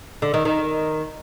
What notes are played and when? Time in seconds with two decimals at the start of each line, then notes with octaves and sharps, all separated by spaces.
0.22 D3
0.34 D#3
0.45 D#3